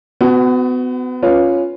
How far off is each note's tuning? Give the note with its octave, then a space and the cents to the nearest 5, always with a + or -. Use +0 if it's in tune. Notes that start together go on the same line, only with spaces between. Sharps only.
B3 +35 F#4 +0
C#4 +0 F4 +0 B4 +0